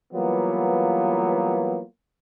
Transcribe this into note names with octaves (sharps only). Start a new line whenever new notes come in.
E3 F#3 G3 A#3 B3 F4